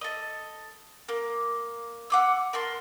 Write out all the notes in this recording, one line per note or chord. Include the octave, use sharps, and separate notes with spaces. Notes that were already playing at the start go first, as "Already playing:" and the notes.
A4 D#5
A#3
F#5 D6 E6
A#4 A5 C6